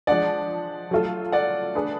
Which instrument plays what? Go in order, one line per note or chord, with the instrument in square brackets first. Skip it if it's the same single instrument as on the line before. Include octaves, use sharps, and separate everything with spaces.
[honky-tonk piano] F3 G#3 D4 [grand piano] D5 F#5
[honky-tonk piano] F#3 A3 F4 A4
[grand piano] D5 F#5
[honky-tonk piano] A3 D4 G#4 B4